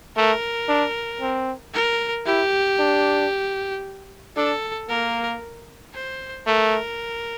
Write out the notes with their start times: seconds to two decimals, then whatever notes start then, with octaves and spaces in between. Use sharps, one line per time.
0.16 A3 A#4
0.68 D4
1.21 C4
1.74 A#4
2.26 E4 G4
2.79 D4
4.37 D4 A4
4.89 A#3 A#4
5.94 C5
6.46 A3 A#4